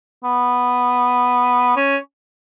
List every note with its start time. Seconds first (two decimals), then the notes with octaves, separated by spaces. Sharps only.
0.24 B3
1.76 C#4